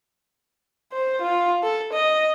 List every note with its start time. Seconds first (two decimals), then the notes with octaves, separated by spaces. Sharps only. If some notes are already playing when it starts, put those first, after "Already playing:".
0.92 C5
1.22 F4
1.63 A4
1.93 D#5